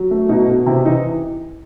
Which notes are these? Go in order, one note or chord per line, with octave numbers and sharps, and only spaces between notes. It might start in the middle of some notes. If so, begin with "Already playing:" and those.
Already playing: F#3
A3
B2 D#4
B2
C3 E4
E3 D#4